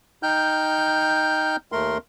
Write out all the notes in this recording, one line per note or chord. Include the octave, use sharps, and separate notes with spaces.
D#4 G5 F6 G6
D#2 A3 A#4 C6